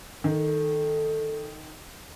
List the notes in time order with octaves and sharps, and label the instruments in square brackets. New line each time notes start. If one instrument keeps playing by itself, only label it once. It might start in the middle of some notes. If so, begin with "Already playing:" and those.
[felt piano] D#3 [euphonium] A4